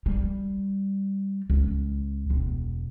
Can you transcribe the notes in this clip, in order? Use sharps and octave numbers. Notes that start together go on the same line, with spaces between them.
G3
C#2
E1